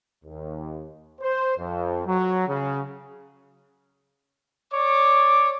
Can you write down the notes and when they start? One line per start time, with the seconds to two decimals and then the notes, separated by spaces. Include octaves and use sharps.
0.25 D#2
1.21 C5
1.57 F2
2.06 F#3
2.48 C#3
4.74 C#5 D5 D6